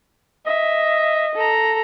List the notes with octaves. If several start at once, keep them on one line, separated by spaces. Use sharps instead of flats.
D#5 E5
A4 A#5